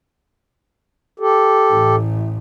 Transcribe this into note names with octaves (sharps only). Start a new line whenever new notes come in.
G4 A4
A1 A2